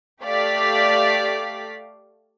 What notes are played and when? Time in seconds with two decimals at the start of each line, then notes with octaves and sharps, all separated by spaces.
0.23 A3 G4 D5 F5 B6